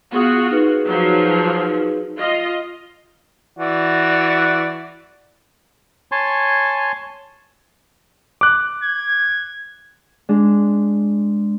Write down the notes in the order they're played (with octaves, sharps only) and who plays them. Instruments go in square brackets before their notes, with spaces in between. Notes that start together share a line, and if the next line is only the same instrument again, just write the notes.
[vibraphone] B3 G#4 D#6 [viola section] F4 F#4
[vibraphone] D#4 G#4 B4
[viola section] F3 F#3
F4 D#5
[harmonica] E3 F#4 D5
[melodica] C#5 G#5 A5 C6
[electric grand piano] D6 F#6
[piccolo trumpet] G#6
[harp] G#3 D4